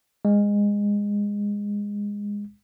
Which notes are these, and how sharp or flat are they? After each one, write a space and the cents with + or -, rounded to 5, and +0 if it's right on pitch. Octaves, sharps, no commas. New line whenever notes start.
G#3 -20